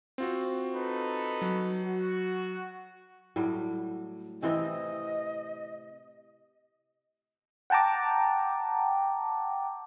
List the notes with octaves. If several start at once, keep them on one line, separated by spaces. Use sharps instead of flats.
C4 F4 F#4
D#4 A4 B4
F#3
F#4
A2 F#3 G3
C3 E3 C4 D#5
F#5 G5 A5 A#5 D6